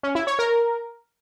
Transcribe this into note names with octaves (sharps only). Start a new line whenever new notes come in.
C#4
E4
C#5
A#4